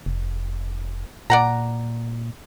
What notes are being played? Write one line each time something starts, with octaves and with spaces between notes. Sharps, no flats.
F1
A#2 D5 F#5 A#5